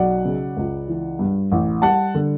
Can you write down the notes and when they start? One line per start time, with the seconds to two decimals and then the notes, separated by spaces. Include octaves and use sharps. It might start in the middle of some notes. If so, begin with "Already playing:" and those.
Already playing: B1 F#3 D5 F#5
0.25 C#3
0.57 C#2
0.88 E3
1.19 G2
1.52 A1
1.82 G3 F#5 A5
2.14 D3